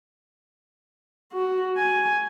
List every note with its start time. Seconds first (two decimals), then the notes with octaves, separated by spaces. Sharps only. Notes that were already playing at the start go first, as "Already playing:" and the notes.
1.32 F#4
1.78 G#5